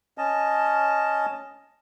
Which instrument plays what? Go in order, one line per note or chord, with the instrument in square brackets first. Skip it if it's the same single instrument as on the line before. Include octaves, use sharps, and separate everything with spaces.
[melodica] C#4 D#5 A5